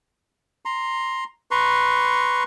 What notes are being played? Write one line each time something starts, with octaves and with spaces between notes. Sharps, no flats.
A#5 C6
B4 A#5 C6 C#6